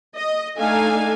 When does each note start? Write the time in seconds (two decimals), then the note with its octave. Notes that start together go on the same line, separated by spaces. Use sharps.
0.15 D#5
0.57 A3 D4 D#4 F5 G#5